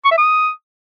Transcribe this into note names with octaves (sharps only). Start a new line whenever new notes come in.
C#6
E5
D#6